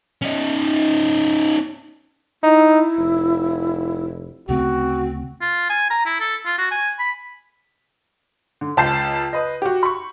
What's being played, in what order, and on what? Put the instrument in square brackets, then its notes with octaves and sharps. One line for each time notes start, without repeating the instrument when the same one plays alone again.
[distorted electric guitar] C#4 D#4
[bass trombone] D#4 [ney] E4
[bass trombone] F1
[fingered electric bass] D2 C#3 A3 [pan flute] C4 [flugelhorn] F#4
[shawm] F4
G#5
A#5
E4
A4
F4
F#4
G#5
B5
[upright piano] D3
C#2 A5 G6 C7
B4 D#5
F#4 G4
B5 C#6